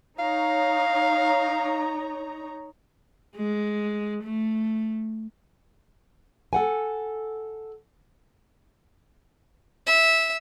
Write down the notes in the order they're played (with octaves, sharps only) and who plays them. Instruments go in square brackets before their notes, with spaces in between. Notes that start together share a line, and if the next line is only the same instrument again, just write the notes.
[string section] D#4 C#5 A#5 [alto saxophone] F5
[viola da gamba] G#3
A3
[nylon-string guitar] A4 F#5 G#5
[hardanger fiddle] E5